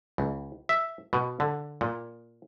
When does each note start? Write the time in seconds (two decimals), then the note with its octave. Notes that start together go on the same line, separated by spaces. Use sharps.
0.18 C#2
0.69 E5
1.13 B2
1.40 D3
1.81 A#2